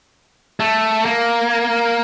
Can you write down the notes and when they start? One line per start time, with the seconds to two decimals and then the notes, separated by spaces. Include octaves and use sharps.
0.60 A3
1.05 A#3